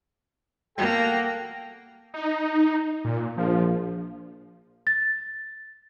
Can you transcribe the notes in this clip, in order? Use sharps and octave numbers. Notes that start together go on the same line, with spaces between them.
A#3 A4 F#5 G5
D#4
A#2
A#1 F3
A6